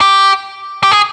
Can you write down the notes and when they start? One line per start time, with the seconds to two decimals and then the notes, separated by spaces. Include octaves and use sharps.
0.01 G4
0.83 G4
0.91 G#4